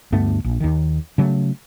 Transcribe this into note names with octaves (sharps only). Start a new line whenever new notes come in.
D2 G2 A3 B3
A#1
D#2 D#3
C#3 F#3 G#3 A3